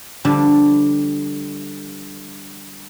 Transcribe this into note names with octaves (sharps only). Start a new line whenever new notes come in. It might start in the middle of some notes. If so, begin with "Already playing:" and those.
D3 F3 G3 D4